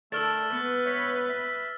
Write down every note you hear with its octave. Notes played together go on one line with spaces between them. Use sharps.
A3 A4 A#4 D5 A5 E6 F6 A6
B3 B4
C#5 E5
E5